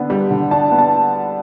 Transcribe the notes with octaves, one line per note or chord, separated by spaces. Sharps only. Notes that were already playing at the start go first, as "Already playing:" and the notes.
Already playing: D3 B3 D4
G3
D3
D4 A5
B3
A5